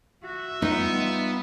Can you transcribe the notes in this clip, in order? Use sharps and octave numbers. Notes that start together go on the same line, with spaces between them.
F#4 E5
G3 B3 D#4 F4